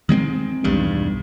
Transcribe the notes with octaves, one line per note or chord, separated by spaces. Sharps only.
D#3 G#3 B3 C4
B1 E2 G2